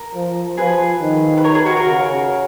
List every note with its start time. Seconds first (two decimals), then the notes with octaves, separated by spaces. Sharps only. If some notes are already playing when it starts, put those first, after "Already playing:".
Already playing: A#4
0.15 F3
0.57 F3 G#4 B4
1.01 D#3
1.38 B4
1.44 A#4 C#5
1.55 G#4 B4
1.66 F#4 A#4
1.76 F#4 A#4
1.87 C#3